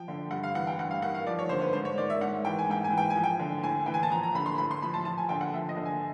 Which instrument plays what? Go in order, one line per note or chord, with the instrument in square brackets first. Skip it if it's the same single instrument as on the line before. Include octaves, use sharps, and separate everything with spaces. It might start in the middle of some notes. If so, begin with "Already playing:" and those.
Already playing: [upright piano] F3 G5
D3
G2 F#5
F5
E3 F#5
G5
G2 F#5
F5
D#3 F#5
F5
F3 D5
C#5
D3 C5
B4
G#2 C5
C#5
D#3 D5
E5
G#2 F#5
E3 G5
G#5
G#2 G5
G#5
E3
G5
G#5
F3
G5
D3
A2 G#5
E3 G5
G#5
A5
F3 A#5
A#5
D3 B5
C6
A2 B5
C6
F3 B5
A5
F3 A5
G#5
D3 G5
F#5
F3 E5
D#5
D3
G#5